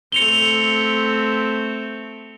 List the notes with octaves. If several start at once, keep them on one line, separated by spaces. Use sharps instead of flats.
A3 C4 C#7 F7 G7